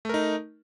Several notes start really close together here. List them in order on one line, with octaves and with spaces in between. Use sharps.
A3 A#4 D#4